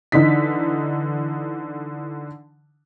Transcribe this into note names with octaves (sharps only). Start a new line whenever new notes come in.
D3 E3 D#4 B6